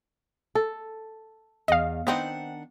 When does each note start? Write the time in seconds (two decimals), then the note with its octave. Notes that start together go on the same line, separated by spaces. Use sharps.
0.55 A4
1.68 E2 D#5 F5
2.07 D#3 B3 C4 D4 D#4 F#5